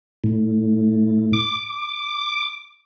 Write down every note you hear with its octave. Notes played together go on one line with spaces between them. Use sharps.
A2
D6